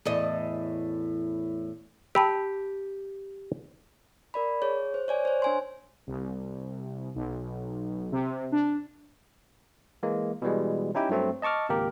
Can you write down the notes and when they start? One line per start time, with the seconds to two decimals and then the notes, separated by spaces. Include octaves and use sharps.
0.05 E2 A2 D#5
2.15 G4 A5 B5 E6
4.34 A#4 D5 B5
4.62 G#4 C#5
4.94 C5
5.08 C#5 D5 G#5
5.25 C5 C#5
5.42 D4 G#5 C6
6.07 C2
7.15 B1
8.12 C3
8.52 D4
10.03 E3 G#3 A#3
10.42 B2 E3 G3 G#3
10.95 C#4 D#4 E4 G4 G5
11.09 G2 F#3 A3 C4
11.42 D#5 A5 C#6 D6 F6
11.69 G#1 C#2 A#3 G4 A#4